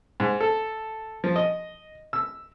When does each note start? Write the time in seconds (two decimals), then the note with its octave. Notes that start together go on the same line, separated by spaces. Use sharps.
0.20 G#2
0.41 A4
1.24 F3
1.36 D#5
2.13 E6